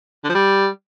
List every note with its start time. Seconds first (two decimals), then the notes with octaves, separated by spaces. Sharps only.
0.24 D3
0.29 F3
0.35 G3